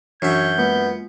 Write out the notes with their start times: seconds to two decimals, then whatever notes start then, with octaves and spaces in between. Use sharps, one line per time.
0.22 F#2 E3 D4 F#4 C#5 E5 G6
0.58 G#3 A#3 B3 F4